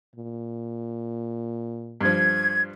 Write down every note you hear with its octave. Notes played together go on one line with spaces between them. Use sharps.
A#2
G2 F3 G#6